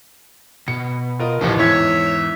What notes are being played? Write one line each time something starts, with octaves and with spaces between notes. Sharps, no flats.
B2 C#7
F4 A#4 D#5
A1 D#2 C3 F3 D#4 G4
E2 G#2 C#5 E5 G#6